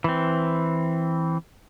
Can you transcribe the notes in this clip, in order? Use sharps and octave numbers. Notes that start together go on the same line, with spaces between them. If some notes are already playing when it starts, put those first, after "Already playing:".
E3 C4